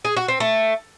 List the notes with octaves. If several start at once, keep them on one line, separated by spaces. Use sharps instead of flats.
G#4
F#4
C4
A3